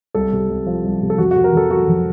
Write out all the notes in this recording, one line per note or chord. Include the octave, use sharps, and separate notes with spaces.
C2 A4
C3
C2
F3
C2
C3
A4
F2 F#4
C3 F#4
A#4
F2 A4
F#3 F#4
F2